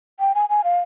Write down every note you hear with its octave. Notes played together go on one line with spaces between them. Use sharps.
G5
G#5
G#5
F5